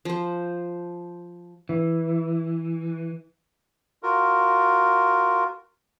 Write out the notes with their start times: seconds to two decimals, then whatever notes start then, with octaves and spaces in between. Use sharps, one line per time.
0.05 F3 C5
1.69 E3
4.03 F4 F#4 A#4